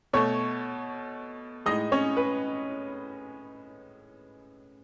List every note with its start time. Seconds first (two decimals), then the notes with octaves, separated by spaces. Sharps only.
0.13 B2 A3 C#5 C#6
1.66 A2 G#3 D#4 D#5
1.92 C#4 C#5
2.17 B4